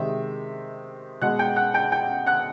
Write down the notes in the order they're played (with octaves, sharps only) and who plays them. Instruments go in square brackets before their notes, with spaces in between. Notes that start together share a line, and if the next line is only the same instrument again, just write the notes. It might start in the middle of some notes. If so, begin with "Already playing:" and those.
Already playing: [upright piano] C3 D#3 G#3 E5
B2 G#3 F#5 F#6
G5 G6
F#5 F#6
G5 G6
G5 G6
F#5 F#6